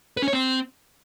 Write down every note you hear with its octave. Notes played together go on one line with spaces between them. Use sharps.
B4
C#4
C#5
C4